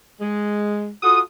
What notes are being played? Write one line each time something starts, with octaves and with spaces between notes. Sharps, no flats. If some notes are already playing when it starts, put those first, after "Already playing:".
G#3
F4 F#4 A4 D#6